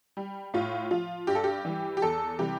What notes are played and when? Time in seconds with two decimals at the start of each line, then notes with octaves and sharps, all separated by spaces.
0.17 G3
0.54 A2 F4
0.91 F3 F4
1.27 G2 G4
1.35 A4
1.44 G4
1.65 E3 G3
1.97 G4
2.02 E2 A4
2.39 C3 E3 G3 G4